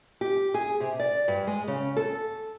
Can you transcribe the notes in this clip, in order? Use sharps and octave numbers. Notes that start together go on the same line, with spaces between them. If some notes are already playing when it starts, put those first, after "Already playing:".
G4
G#4
C3
D5
G2
G#3
C#3
A4